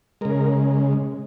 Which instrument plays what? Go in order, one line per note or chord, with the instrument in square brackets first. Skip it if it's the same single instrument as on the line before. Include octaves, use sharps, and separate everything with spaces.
[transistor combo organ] C#3 G#3 A#4